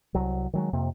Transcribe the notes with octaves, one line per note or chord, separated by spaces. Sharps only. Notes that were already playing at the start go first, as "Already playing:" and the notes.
C2 F#3
D#3 F#3 G#3
F2 C3 A#3